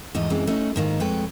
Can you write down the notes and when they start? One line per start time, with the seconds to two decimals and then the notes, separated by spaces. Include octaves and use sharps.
0.15 E2 G#2 A3 D#5
0.30 F#2 E3 G#3 C4
0.47 A3 C#4 D#4 E4
0.76 G#2 D#3 A#3
1.00 F2 G#3 A4 B4 C#5 G5